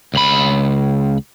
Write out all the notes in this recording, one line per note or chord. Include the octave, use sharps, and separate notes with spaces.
C#2 B5